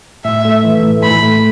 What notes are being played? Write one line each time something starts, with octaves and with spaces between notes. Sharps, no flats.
A2 E5
A3
E3
A2
A2 B5
A3